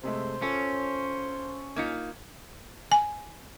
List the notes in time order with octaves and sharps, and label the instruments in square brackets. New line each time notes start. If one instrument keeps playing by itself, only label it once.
[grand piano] C3 G#3 A3 [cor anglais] C5
[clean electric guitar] C#4 [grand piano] F4 A4 C#5
[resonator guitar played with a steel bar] A#3 D#4 F4 [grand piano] G#6 B6 C#7
[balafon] G#5